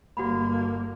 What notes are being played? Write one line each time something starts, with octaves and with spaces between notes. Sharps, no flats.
G1 A#3 F#4 F#5 B5